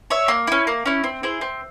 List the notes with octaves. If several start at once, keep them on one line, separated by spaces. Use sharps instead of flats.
C#5 E5
A#3
C#4 E4
A#3
C#4 E4
C4
E4 G#4 C5
C4